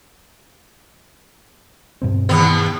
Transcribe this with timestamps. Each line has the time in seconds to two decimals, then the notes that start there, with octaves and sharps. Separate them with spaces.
2.02 G2 B2 C4
2.29 D#2 B3